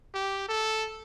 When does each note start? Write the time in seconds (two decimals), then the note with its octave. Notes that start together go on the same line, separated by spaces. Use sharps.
0.14 G4
0.48 A4